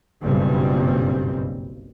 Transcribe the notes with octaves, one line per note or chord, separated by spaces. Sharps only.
F#1 B1 G2 A#2 G3 C4